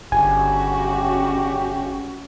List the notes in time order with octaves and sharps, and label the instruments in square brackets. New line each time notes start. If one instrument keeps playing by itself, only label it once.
[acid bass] G1 [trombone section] C#3 G4 [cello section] C#4 F#4 [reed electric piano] G#5